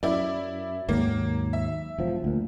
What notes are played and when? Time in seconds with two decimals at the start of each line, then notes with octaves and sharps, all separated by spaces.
0.03 F#2 E4 D5
0.89 D#2 G#2 F#3 A#3
1.53 E5
1.98 E1 F3
2.24 D2 A#2